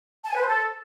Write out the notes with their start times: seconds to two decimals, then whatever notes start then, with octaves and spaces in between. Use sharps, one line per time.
0.24 A5
0.30 G#5
0.35 B4
0.41 C5
0.47 A4